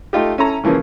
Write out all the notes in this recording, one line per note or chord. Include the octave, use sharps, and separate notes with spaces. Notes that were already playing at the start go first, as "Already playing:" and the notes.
A3 D#4 F4 G4
C#4 E4 A4 A#5
C#3 E3 F3 A#3 C#4